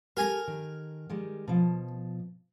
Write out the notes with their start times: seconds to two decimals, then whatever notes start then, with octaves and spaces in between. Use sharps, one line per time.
0.17 G4 A4 A#4 G#5 A#5
0.47 D#3
1.10 D#3 G3 G#3
1.48 B2 F3